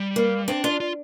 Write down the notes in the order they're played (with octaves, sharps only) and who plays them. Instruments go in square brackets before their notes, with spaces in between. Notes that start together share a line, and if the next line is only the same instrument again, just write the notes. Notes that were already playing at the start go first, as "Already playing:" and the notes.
Already playing: [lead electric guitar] G3
[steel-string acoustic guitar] A#3
[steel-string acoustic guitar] C4 [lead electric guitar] D4
[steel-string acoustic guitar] D4 [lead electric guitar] F4
[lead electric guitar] F4